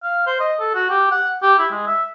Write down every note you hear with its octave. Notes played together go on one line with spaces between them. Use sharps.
F5
C5
D#5
A4
F#4
G4
F#5
G4
E4
G#3
E5